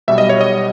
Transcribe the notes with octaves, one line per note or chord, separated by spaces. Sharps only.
B1 B2 G3 E5
D#5
C#5
D#5